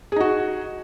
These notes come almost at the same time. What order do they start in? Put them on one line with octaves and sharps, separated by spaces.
G#4 D#4 F#4